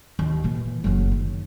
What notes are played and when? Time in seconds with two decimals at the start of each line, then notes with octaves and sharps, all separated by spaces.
0.19 D#2
0.44 A#2 E3
0.84 F#1 F#3
1.12 D#3